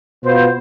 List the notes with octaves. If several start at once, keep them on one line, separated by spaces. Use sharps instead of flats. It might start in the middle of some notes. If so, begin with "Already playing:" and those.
B2 B3 F4 C5